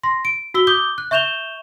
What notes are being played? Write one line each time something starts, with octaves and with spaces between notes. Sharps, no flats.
C6 A#6
D7
F#4 E6 B6 G7
D6 D#6 G6 G7
F#6
E5 C#6 G6 E7 F7 G7